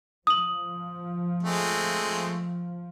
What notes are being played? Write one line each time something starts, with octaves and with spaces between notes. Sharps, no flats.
F3 D#6 F#7
G#3 A3 C4